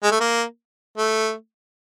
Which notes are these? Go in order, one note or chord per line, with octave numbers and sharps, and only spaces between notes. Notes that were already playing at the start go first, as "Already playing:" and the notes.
G#3
A3
A#3
A3